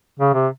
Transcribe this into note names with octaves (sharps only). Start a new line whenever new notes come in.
C#3
C3